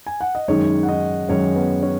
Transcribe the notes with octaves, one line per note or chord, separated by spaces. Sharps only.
G#5
F#5
D#5
F#2 D#3 G#3 C#4 D#4 C#5
F#5
D#4 D#5
F#2 D#3 G#3 C#4 D#4 C#5
B3 B4
C#4 C#5